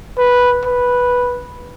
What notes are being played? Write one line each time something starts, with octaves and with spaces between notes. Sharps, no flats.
B4
B4